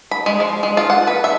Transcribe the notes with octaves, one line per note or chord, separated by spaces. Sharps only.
B5
G#3
F3
G#3
F4
F#5
B4
E5